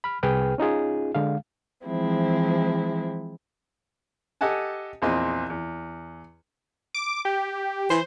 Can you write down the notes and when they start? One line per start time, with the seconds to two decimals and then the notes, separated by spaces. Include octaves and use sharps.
0.04 B5 F6
0.23 C2 G#4 B4 G5 F6
0.58 C#4 D#4 F4 G#4
1.15 D3 G#3 F5
1.86 E3 F3 G#3 C4 E4
4.41 G4 A4 D#5 F#5 G#5 A5
5.02 A#1 E2 C4 D#5 C6
5.50 E2
6.94 D6
7.25 G4
7.90 E3 C5